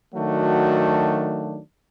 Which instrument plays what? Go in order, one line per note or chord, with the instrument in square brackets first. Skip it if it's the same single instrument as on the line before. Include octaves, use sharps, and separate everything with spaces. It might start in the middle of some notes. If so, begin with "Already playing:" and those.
[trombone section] D#3 F#3 A3 D4 F#4